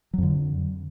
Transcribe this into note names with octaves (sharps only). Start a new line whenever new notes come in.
F2 D3 F#3